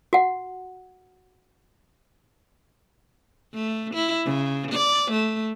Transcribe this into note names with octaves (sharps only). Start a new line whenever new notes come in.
F#4 F#5
A3
E4
C#3
D5
A3